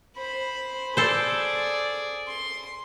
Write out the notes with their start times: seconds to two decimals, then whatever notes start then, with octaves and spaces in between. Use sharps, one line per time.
0.17 C5 B5
0.97 G#4 A4 C5 D5
2.28 C6